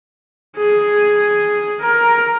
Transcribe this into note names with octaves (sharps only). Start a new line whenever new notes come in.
G#4
A#4